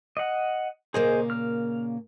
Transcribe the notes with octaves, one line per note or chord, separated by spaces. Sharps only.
D#5 F#5
A#2 C#3 A#3 G#4 C5 D#5
F6